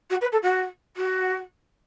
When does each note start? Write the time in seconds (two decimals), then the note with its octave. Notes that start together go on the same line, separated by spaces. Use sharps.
0.10 F#4
0.21 B4
0.32 A4
0.43 F#4
0.97 F#4